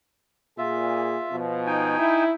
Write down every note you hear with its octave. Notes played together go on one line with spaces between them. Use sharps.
A#2 F4 G#4 E5
B2 F3
D#4 G5 G#5
E4